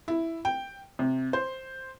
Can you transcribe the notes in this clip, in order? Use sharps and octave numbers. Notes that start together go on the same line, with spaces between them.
E4
G5
C3
C5